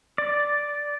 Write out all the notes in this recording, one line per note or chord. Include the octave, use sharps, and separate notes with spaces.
D5